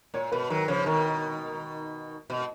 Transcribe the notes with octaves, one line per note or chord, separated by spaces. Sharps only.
A#2 C#5
B2 B4
D#3 F#3 A#4
C#3 F3 C#5
B2 D#3 A#4
B2 D#5